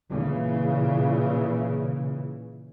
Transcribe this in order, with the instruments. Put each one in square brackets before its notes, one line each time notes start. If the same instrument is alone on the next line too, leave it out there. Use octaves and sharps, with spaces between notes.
[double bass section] A#2 C#3 E3